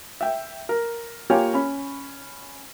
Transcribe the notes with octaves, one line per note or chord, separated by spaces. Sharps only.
E5 G5
A#4
A#3 F4 G4 C#5 G5 G#5
C#4 B5